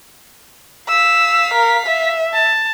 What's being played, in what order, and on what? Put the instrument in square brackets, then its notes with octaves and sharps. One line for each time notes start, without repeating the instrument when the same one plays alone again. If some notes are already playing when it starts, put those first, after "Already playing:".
[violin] F5 B6 [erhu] E6
[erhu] A#4
E5
[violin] A5